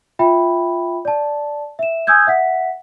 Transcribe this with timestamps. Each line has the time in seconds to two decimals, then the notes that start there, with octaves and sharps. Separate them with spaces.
0.19 F4 E5 G5 B5
1.05 D5 A5
1.79 E5 E7
2.07 G#5 D#6 E6 G6 G#6
2.27 E5 F#5 B6